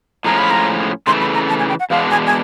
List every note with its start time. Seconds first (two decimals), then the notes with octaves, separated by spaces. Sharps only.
0.25 A2 F3 G#3 C#4 F4 A#5
0.38 B5
0.51 A#5
1.07 C#3 E3 A3 C6
1.21 B5
1.34 A#5
1.49 A5
1.59 G#5
1.69 G5
1.80 F#5
1.90 E2 B2 G#3 B3 D4 F5
2.11 G#5
2.26 G#5